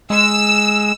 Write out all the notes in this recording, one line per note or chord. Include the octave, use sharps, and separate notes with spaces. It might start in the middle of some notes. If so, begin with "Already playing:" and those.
G#3 E6